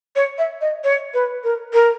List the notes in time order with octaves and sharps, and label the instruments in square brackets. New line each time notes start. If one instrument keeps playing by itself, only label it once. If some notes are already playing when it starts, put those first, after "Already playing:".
[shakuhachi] C#5
E5
D#5
C#5
B4
A#4
A#4